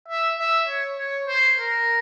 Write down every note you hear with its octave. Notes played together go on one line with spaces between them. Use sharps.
E5
E5
C#5
C#5
C5
A#4